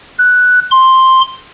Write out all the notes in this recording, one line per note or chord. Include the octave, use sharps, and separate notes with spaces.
F#6
C6